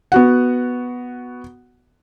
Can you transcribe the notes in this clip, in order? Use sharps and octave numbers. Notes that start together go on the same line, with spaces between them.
B3 F#4 F#5